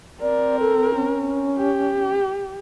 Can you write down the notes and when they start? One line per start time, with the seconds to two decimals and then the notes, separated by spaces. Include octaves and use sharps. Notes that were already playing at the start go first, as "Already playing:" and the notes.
0.21 C4 A#4 D5
0.60 A4
0.95 C#4
1.58 G4